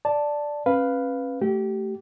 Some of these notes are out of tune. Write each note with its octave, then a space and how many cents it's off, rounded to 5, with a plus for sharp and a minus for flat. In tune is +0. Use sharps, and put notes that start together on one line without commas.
D5 +0 A5 +0
C#4 -35 B4 +0 F5 +0
A3 +0 G4 -25